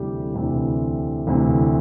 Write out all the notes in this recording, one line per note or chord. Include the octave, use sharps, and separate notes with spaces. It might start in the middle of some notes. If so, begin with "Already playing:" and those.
Already playing: D2 C3 E3 G3 G4
D2 C3 E3
D2 C3 E3